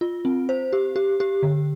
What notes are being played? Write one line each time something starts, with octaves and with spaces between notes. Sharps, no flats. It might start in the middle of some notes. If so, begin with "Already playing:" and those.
F4
C4
C5
G4
G4
G4
D3